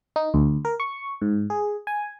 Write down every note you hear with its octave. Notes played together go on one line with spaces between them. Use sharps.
D#4
D2
A#4
C#6
G#2
G#4
G#5